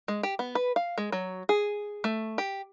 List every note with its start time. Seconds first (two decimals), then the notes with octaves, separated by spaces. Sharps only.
0.08 G#3
0.23 G4
0.39 B3
0.55 B4
0.76 F5
0.98 G#3
1.12 F#3
1.49 G#4
2.04 A3
2.38 G4